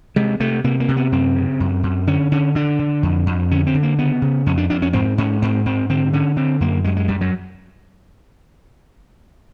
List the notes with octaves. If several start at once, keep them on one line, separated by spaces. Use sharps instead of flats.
C3 G#3
C3 A3
C3 A#3
A#3
C3
B3
F#2 C4
C#3
F#2
F#2
D3 C#4
D3 C#4
D3 D4
D3
F2
F2
D3 C#4
C4
D3
A#3
C#3 B3
C#3
F2 C#4
D4
F2 D4
C#4
G#2 C4
G#2 C#4
G#2 C4
G#2 C4
D3 C4
D3 C#4
D3 C4
F#2 A#3
F#2 G#3
G#3
F#2 G3
F#3